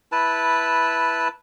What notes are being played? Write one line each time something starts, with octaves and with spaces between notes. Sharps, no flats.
E4 B4 A5